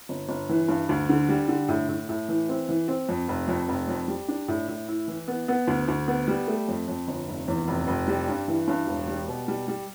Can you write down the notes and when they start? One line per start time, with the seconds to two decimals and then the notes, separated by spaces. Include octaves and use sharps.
0.09 G1
0.29 G1
0.49 E3
0.68 G2
0.89 D2
1.09 D3
1.29 G3
1.49 D3
1.68 A2
1.89 A2
2.09 A2
2.29 E3
2.49 C4
2.69 E3
2.88 C4
3.09 F2
3.28 F1
3.48 F2
3.68 F1
3.88 F2
4.08 G3
4.28 D4
4.48 A2
4.68 A2
4.88 E4
5.08 E3
5.28 B3
5.48 B3
5.68 D2
5.88 D2
6.08 B3
6.28 G3
6.47 A3
6.68 F2
6.88 F2
7.08 G1
7.28 F1
7.48 E2
7.68 F1
7.87 F1
8.08 G3
8.28 G2
8.48 E3
8.68 G2
8.87 E1
9.07 G3
9.28 B2
9.48 G3
9.68 G3